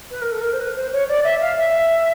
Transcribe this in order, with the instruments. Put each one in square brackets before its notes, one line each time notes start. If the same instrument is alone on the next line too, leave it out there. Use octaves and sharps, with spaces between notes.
[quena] B4
A#4
A4
A#4
C5
B4
C5
C#5
D5
E5
F5
E5